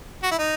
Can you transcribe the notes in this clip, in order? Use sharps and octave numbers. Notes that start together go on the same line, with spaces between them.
F#4
E4
D#4